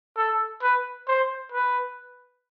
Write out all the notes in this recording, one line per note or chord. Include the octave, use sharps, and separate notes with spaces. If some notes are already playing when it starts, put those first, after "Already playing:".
A4
B4
C5
B4